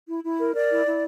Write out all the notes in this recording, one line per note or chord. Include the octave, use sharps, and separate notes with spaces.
E4
E4
A#4
A#4 D5
E4
E4